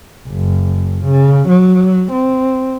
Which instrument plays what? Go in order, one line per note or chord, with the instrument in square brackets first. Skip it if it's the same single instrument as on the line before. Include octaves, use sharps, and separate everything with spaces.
[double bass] F#1
C#3
F#3
C4